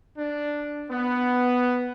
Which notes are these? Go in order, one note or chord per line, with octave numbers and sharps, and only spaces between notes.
D4
B3